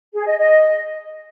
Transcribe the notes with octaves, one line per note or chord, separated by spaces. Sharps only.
G#4
D#5
D#5